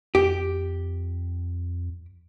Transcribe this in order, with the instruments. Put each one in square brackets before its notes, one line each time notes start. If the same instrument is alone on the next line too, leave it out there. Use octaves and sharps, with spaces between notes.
[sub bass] F2 [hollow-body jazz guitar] G4